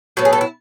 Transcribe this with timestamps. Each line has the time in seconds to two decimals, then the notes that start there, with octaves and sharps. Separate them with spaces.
0.17 A2 F#3 B3 F#4
0.25 G#4
0.33 A4
0.41 E4